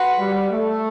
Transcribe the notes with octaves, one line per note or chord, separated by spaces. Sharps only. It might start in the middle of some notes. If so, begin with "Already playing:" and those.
Already playing: F#4 B4 F#5 C6
G3
A3